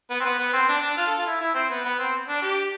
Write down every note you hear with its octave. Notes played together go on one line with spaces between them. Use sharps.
B3
C4
B3
B3
C4
D4
D4
F4
A4
F4
E4
E4
C4
B3
B3
C4
D4
G4